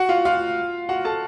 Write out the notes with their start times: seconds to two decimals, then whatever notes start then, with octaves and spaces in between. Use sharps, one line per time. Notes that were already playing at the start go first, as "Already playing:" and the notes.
Already playing: F#4 F#5
0.09 F4 F5
0.25 F4 F5
0.89 F#4 F#5
1.05 A4 A5